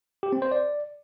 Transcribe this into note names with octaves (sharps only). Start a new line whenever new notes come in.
G4
C4
C5
D5